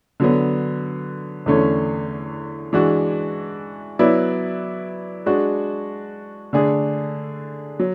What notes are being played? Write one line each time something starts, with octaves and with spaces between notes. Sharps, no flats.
D3 F#3 B3
E2 D3 A3 C#4
E3 G#3 D4 F#4
F#3 B3 E4 B4 D5
G#3 D4 F#4
D3 A3 D4 G#4
F#3